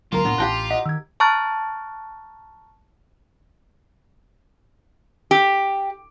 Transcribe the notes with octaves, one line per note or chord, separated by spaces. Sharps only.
C#2 D3 F#3 A#3 F4 A#4
A2 B3 D4
A1 G4 F5 G5 A5 A#5 F#6
D#5 F#5 B6
D#3 E6 G#6
A5 A#5 C#6 F6 F#6 A6
G4